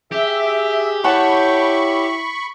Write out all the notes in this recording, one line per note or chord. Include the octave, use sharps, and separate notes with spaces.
G4 G#4 E5
E4 C#5 F#5 A5 B5 C#6